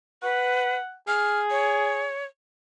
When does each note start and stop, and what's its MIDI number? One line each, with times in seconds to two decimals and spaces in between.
0.23 0.76 71
0.23 0.95 78
1.08 2.10 68
1.08 1.40 89
1.50 2.24 73